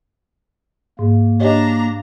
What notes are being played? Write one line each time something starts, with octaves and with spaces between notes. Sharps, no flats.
G#2 A#3
D4 G4 C#5 D#5 A#5